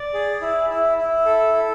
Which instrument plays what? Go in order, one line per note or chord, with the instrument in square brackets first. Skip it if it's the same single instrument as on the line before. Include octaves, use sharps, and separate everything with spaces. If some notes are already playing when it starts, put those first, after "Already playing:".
Already playing: [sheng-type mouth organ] D5
G#4
E4
E4
E4
A4
A4